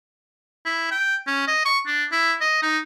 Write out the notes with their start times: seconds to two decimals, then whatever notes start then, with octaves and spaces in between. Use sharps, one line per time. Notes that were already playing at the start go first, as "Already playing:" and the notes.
0.65 E4
0.91 G5
1.27 C#4
1.47 D#5
1.65 C#6
1.86 D4
2.12 E4
2.41 D#5
2.62 D#4